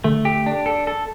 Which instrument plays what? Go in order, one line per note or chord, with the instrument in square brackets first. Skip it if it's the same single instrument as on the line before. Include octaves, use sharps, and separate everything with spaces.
[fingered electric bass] D3 [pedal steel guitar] A3
[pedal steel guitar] G4
D4
A4
A4